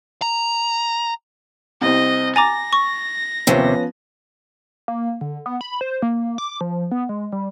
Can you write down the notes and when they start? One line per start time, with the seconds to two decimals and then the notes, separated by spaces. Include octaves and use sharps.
0.22 A#5
1.81 C2 C4 D#5
2.36 G#5 A#5 D6 A6 A#6
2.73 C#6
3.47 D#2 C3 F3 B3 C#4
4.88 A#3
5.21 D3
5.46 B3
5.61 B5
5.81 C5
6.02 A#3
6.38 D6
6.61 F3
6.92 B3
7.09 G#3
7.32 G3